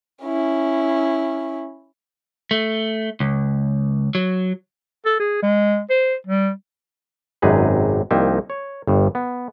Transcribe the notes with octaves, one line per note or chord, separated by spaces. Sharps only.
C#4 E4
A3
C#2
F#3
A4
G#4
G#3
C5
G3
G#1 F#2 C3 D#4 G#4 B4
C2 F3 A#3 D#4 E5 G5
C#5
G1 G2
B3